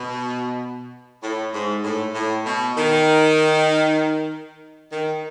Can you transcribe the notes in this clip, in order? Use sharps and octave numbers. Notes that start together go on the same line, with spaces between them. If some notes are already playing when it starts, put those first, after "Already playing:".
Already playing: B2
A2
G#2
A2
A2
B2
D#3
D#3